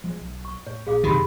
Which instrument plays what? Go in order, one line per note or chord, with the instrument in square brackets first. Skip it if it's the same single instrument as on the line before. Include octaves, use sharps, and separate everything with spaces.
[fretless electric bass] F3 G#3
B1
[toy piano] C#6
[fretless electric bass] A2 [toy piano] C#5
[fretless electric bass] A#1 [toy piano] G#4 F5 D6
[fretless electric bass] F#2 [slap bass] C3 D#3 [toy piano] G4 B5 C6